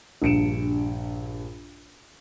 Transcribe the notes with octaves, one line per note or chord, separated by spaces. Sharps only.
A#1 G2 C#7 D7 E7